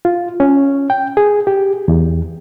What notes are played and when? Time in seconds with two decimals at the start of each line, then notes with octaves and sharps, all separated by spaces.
0.05 F4
0.40 C#4
0.90 G5
1.17 G#4
1.47 G4
1.88 E2